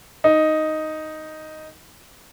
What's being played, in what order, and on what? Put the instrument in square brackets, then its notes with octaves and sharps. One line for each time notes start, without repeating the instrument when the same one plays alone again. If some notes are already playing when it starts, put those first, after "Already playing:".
[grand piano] D#4